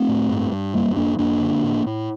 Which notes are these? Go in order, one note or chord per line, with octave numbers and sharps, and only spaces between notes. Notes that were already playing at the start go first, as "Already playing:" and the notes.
Already playing: A3 C4
A2
G2
G2
F#2 G3 A#3
F#2 A#3 D4
F#2 A#3 D4
D3
A2
A2